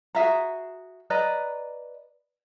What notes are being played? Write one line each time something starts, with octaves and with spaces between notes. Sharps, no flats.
F#4 G#4 E5 A#5
B4 D5 D#5 A#5